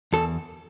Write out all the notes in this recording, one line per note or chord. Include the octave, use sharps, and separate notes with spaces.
E2 A4